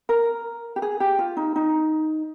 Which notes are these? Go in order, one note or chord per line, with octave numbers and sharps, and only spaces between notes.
A#4
G4
G#4
G4
F4
D#4
D#4